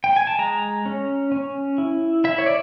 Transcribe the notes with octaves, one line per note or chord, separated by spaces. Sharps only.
G5
G#5
A5
G#3 A#5
C#4
C#4
E4
E4 E5
C#5
D5